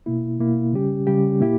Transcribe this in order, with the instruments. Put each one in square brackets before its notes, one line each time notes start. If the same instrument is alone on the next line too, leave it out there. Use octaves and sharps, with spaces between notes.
[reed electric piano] B2 A#3 E4
B2 A#3 E4
C#3 G3 C#4 G4
C#3 G3 C#4 G4
A#2 A#3 E4 G4